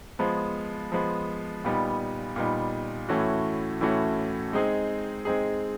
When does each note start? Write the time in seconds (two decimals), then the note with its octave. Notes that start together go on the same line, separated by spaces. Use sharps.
0.19 F3 G#3 B3
0.92 F3 G#3 B3
1.65 A#2 G3 B3 D#4
2.36 A#2 G3 B3 D#4
3.09 A2 E3 A3 C#4 F#4
3.81 A2 E3 A3 C#4 F#4
4.53 G#3 C4 D#4 G#4
5.25 G#3 C4 D#4 G#4